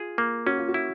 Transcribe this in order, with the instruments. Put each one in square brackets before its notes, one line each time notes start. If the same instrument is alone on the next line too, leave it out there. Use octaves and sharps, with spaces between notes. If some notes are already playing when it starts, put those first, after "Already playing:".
Already playing: [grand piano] F4 [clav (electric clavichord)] G#4
[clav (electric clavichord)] A#3
[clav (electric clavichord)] C#4 [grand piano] F#4
[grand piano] F4
F#4
[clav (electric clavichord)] E4